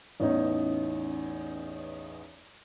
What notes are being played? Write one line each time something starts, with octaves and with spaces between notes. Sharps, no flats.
A1 E2 C#4 D#4